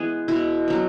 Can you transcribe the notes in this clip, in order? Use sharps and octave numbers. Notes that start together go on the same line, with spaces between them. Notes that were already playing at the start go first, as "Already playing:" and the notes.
Already playing: E3 G#3 B3 E4 G#4
B2 E4
F#3 B3